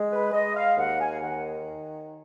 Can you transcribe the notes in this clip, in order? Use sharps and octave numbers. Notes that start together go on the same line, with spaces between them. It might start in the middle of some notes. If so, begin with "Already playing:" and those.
Already playing: G#3
B4
G#3 D#5
F5
D#2 F#5
G#5
D#3 F#5